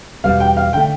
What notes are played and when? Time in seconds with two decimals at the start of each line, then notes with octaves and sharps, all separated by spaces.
0.24 E2 B2 G3 B3 F5
0.40 G5
0.57 F5
0.73 D3 A3 G5